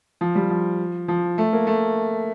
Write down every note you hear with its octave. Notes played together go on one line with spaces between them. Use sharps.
F3
G3
F3
F3
A3
A#3
A3